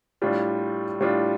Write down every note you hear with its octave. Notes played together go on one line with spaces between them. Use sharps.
A2 G3 D4 F4
A2 G3 D4 F4